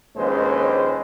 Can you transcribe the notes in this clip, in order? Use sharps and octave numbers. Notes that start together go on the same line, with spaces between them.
A#1 D#2 G#3 C#4 B4 C5